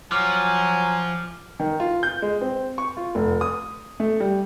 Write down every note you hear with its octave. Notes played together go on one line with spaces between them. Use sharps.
F3 F#3 G#5 D6 F6
D#3
F4
G6
G#3
C4
C#6
F4
F1
D#6
A3
G3